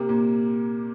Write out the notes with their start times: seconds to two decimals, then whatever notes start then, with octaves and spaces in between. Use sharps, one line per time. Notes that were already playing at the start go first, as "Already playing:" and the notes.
Already playing: C3 A#3
0.09 A#2